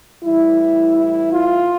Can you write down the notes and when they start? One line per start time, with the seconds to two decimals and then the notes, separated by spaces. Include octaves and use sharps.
0.23 A2 E3 G3 E4
0.95 E4
1.31 F4